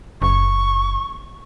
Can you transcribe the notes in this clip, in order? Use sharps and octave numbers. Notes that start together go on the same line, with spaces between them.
F#1 C#6